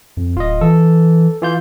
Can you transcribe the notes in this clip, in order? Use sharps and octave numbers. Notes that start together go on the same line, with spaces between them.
F2
D1 F4 D#5
E3 A4
E3 F4 G6